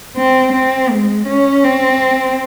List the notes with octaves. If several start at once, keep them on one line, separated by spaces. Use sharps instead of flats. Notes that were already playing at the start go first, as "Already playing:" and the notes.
C4
C4
G#3
C#4
C4